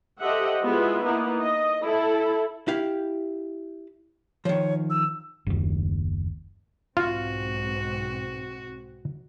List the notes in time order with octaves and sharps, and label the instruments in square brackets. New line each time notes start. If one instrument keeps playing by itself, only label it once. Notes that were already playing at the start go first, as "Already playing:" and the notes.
[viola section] G4 A4 C5 D#5 E5 F#5
G#3 B3 E4 F4 E5
A#3 B3 D#4 E4
D#5
E4 A4
[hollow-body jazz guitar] E4 G4 F5
[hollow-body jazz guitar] D#3 F3 [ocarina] C#5
[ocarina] E6
[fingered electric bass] F#1 D#2
[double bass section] B1 G#2 C4 [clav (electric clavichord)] F4 [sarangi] F#4